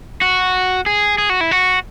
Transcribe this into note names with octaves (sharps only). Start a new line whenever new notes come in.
F#4
G#4
G#4
F#4
E4
F#4